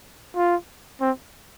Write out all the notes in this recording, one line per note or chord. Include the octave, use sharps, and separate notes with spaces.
F4
C4